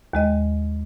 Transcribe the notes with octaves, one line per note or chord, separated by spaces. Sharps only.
D#2 G#3 D#5